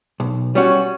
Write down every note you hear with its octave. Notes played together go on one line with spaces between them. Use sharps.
B1
G3 C#4 F#4 C#5